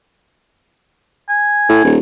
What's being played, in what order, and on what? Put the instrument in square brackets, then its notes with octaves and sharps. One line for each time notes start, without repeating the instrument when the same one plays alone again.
[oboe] G#5
[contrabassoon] A2
D#1